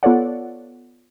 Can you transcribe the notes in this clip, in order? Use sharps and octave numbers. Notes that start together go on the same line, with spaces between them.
B3 F4 A4 C#5 D5 F#5